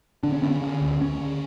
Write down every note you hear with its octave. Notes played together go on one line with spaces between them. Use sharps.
D3 D4
C#4
D3 B3
C#4
D3
D2
D2 C#4
D3